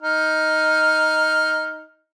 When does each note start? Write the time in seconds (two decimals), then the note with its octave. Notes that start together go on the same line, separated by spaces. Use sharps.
0.02 D#4 F6